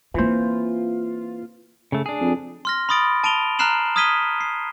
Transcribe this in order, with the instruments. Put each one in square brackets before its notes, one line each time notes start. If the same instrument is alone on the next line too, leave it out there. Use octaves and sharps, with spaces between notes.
[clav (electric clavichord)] E3 C5 [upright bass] A#3 C4 [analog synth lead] F4
[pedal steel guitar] C#3 A3
D4 G#4
[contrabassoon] F2
[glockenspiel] C6 F6 A#6
B5 C6 D#6 A6 D7
A5 D7 D#7 F7 G7
A#5 F6 F#6 C7 E7 F#7
D#6 F6 G#6 B6 D#7 G7
C7